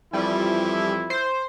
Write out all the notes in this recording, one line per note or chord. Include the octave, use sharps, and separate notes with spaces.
F2 E3 F3 G3 E4
C5